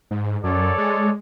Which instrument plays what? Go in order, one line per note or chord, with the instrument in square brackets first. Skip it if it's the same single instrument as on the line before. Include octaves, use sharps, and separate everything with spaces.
[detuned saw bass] G#2
[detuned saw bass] F#2 [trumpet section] A4 C#5 D5
[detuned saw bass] G#3